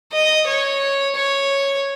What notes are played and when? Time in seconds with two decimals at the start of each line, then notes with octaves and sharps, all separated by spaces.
0.12 D#5
0.47 C#5
1.15 C#5